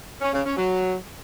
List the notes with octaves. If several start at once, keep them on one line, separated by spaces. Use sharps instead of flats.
C#4
C#3
C#4
F#3